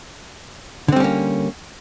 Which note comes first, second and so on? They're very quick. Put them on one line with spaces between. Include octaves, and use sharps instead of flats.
D3 C4 G3 C#4 A#3